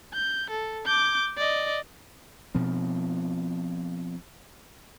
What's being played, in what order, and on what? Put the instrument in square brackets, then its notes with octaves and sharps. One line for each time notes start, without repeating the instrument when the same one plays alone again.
[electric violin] G6
A4
D6 G6
D5 D#5
[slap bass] B2 F3 C4